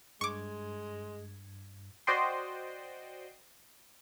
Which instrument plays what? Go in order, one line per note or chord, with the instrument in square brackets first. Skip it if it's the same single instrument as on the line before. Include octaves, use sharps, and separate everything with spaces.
[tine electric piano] G2 G#6 [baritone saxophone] G#3 [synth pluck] C#6 D6
[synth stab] F#4 C5 D5 D#5 G5 C6